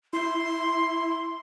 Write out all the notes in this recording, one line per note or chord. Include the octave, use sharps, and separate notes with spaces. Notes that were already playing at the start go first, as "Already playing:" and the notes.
E4 C6